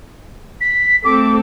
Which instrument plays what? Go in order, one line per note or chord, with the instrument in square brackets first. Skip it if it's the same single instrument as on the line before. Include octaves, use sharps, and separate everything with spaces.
[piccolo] B6
[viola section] A3 C4 A4 [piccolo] D6